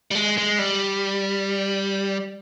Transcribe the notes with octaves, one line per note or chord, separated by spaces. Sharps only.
G3
G#3
G#3
G3